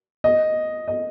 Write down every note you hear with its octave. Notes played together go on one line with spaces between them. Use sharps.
D#5
D#5